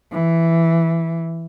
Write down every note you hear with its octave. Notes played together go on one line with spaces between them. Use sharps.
E3